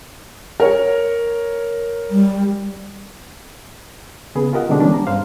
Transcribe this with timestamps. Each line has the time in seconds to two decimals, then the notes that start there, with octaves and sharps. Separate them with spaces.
0.60 A#4 C#5
2.10 G3
4.35 C#3 B3 G#4 B4
4.53 F4 G4 A#4 D#5 F#5
4.69 B2 D3 G#3 C4 D4 F#4
4.80 E3 G3 B3 C#4 D4
4.94 A#5
5.07 G2 C5 F5